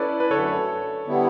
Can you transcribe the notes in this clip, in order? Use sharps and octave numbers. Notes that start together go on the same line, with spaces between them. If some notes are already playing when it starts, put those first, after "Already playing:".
Already playing: C#4 E4 A4 B4 C#5 D5
B4
F#2 D3 A3 A4 C#5
D3 G3 B3 E4